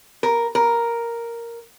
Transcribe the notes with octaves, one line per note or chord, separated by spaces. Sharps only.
A#4
A#4